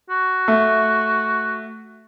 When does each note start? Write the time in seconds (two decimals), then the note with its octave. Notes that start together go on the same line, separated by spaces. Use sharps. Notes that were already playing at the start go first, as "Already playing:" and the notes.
0.10 F#4
0.48 A3